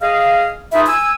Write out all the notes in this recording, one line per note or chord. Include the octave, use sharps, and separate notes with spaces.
G#4 D#5 F5
D#4 F4 G#4 B4 E5
G#5 E6